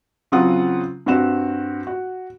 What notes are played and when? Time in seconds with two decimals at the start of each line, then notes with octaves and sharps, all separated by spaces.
0.32 C#3 F#3 C4 F4 F#5 D#6
1.06 G2 C4 F#4 E7
1.87 F#4